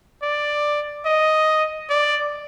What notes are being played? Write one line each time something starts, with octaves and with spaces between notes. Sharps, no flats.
D5
D#5
D5